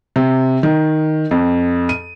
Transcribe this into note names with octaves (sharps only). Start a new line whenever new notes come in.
C3
D#3
F2
D#7